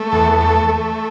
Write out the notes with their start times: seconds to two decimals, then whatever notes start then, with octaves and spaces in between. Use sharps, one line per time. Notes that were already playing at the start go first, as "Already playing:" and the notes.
Already playing: A3
0.12 E2 A4
0.41 A3
0.69 A3